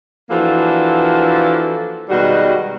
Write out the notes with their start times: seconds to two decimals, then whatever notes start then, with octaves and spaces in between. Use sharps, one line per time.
0.29 E3 F3 A#3 D4 F#4 A4
2.09 B2 D#3 G3 G#3 F#4